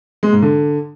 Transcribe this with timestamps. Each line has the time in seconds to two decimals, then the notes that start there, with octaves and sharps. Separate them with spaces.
0.23 G#3
0.33 G#2
0.42 D3